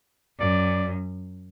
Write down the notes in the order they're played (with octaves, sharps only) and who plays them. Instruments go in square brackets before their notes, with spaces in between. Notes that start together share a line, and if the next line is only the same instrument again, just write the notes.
[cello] F#2 [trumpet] D5